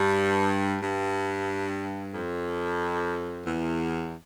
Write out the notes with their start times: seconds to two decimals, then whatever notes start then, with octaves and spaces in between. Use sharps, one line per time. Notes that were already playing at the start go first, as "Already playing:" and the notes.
Already playing: G2
0.81 G2
2.13 F2
3.45 E2